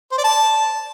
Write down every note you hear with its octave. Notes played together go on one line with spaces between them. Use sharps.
C5
D5
A5